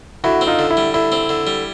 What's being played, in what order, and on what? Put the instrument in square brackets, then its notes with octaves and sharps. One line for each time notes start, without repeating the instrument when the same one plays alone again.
[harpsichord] D3 [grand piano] E4 F#4
[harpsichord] C4
[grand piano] D#4 F4
[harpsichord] D3
[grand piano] E4
[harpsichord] G3
[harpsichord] D3 [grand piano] E4
[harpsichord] C4
D3
G3